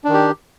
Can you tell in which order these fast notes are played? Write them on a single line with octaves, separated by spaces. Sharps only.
D4 D#3 G4